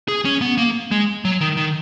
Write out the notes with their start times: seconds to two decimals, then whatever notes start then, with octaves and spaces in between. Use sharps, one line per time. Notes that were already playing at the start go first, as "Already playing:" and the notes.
0.08 G#4
0.25 C#4
0.42 B3
0.58 A#3
0.91 G#3
1.25 F#3
1.41 D#3
1.57 D#3